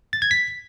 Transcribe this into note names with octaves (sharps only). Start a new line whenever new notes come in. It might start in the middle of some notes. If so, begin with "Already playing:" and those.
A6
G#6
B6